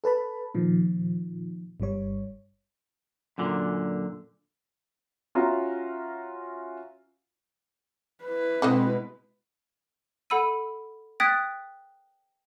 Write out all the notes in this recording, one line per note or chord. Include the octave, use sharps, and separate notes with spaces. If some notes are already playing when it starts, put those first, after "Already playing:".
A4 B4 A5 B5
A#2 D#3 F3
G1 G2 G3 C#5
F#2 A#2 D3
C#4 F4 F#4 E5 A#5
E4 B4
B2 D3 G#3 C4 C5 D#5
A4 F#5 B5 E6 D#7
G5 D#6 F#6 G#6 A6 B6